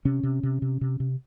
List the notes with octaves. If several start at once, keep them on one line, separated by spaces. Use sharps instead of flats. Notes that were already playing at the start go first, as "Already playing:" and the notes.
C3 C#4
C3
C3
C3
C3
C3